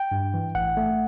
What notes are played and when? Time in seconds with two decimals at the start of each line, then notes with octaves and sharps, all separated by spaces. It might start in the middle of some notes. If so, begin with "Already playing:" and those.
Already playing: G5
0.12 G2
0.34 E3
0.55 A1 F#5
0.77 A3